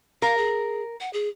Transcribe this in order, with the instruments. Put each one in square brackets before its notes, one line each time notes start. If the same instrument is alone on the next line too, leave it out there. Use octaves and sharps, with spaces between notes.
[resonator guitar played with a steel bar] A#4 [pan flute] F5
[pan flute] G#4
F#5
G#4